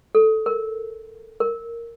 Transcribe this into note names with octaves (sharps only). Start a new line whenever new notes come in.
A4
A#4
A#4